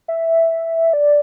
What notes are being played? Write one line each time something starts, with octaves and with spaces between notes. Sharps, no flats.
E5
D5